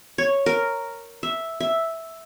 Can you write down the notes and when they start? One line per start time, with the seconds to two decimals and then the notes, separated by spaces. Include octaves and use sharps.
0.18 C#5
0.46 A#4
1.23 E5
1.60 E5